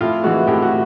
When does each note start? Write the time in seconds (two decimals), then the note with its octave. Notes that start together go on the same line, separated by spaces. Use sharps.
0.01 A2 F4
0.24 E3 G#3 F#4
0.47 A2 G4
0.62 F#4